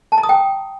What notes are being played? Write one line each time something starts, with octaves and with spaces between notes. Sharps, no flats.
A5
A#5
D#6
G5